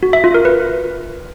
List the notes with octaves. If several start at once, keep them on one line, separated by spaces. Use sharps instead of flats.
F#4
E5
F4
A#4
B4